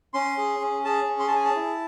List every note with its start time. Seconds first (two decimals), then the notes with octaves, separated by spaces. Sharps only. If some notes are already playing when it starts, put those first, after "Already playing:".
0.14 C#4 C6
0.38 G#4
0.61 C#4
0.85 G#4 A5
1.08 C#4
1.20 C6
1.28 A5
1.31 G#4
1.36 G#5
1.45 A5
1.55 E4